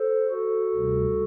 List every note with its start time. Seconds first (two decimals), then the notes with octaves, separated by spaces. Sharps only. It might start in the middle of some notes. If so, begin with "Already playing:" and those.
Already playing: A4 C5
0.30 F#4 A4
0.75 D2 C3 G3